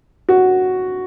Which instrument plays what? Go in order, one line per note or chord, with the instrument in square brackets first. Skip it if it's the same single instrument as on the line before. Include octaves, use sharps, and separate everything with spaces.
[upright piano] F#4